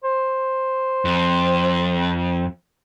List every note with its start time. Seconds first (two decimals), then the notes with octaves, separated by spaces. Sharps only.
0.04 C5
1.05 F2